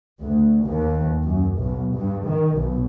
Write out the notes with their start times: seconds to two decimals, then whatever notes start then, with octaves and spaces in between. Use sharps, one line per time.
0.22 D2
0.64 D#2
1.24 F#2
1.57 B1
1.95 G2
2.26 D#3
2.55 B1